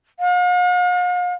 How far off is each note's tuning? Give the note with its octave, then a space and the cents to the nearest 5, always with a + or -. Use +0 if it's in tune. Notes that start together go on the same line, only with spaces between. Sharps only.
F5 +45